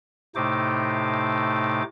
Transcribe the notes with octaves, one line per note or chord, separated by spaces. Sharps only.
A2 C3 A3 D#4 C5 D6